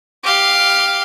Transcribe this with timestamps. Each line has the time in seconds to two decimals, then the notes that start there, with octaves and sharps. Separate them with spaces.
0.24 G4 F5